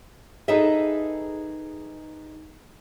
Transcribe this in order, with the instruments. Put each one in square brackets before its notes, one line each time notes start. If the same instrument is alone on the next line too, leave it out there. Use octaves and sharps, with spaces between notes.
[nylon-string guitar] D#4 G#4 A4 B4 D#5 E5